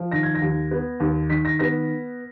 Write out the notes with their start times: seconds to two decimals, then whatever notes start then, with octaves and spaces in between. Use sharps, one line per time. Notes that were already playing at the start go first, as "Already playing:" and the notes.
Already playing: F3
0.12 D#3 A#6
0.23 G#6
0.35 A#6
0.42 D#2
0.71 B3
1.00 D#2
1.30 D#3 B6
1.45 A#6
1.59 B3 A#6